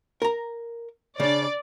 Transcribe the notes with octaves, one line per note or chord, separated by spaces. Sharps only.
A#4 A#5
C#3 D4 D5